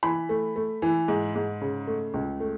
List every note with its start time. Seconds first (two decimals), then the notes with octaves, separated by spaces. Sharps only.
0.03 E3 B5
0.29 A3
0.56 A3
0.82 E3
1.08 G#2
1.35 G#2
1.61 C#3
1.87 A3
2.14 C#2
2.40 A3